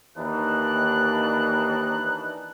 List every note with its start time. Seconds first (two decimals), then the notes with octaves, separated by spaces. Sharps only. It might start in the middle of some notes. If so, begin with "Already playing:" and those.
0.17 D#2 E3 D4 D#4 F#6